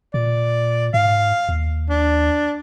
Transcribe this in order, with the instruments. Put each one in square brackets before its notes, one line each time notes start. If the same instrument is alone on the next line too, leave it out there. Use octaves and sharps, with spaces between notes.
[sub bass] A#2 [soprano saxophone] D5
[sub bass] G#2 [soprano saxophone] F5
[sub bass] D#2
[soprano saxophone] D4